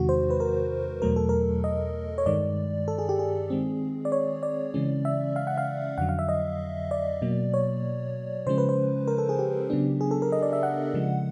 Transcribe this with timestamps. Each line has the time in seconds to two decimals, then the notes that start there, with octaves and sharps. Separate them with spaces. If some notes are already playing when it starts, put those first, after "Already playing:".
Already playing: E2 C3 D#3 G#3 F#4
0.09 C5
0.30 B4
0.40 A#4
1.02 E2 B2 F#3 A3 A#4
1.16 A4
1.29 A#4
1.64 D#5
2.18 C#5
2.26 G2 D#3 G#3 D5
2.88 A4
2.98 G#4
3.09 G4
3.19 G#4
3.50 D#3 G#3 C4
4.05 D5
4.12 C#5
4.43 D5
4.74 C#3 E3 G#3 C#4
5.05 E5
5.36 F5
5.47 F#5
5.58 F5
5.98 F2 D3 F#3 F#5
6.09 F5
6.19 E5
6.29 D#5
6.91 D5
7.22 B2 F#3 A#3
7.54 C#5
8.47 C#3 F3 G#3 C#4 C5
8.58 B4
8.69 C5
9.07 A#4
9.18 A4
9.29 G#4
9.39 G4
9.70 C#3 F#3 B3 D4
10.01 G#4
10.11 A4
10.22 A#4
10.32 D#5
10.42 D5
10.53 E5
10.63 F#5
10.94 C#3 F3 G#3